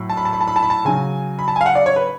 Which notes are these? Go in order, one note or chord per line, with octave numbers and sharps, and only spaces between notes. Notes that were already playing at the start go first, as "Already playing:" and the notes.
Already playing: A2 F#3
A5
B5
A5
B5
A5
B5
A5
B5
A5
C#3 F#3 G#5
B5
A5
G#5
F5
F#5
D5
C#5
B4